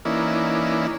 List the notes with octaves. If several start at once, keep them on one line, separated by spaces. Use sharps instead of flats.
E3 A#3 C#4 D#4 E4 D5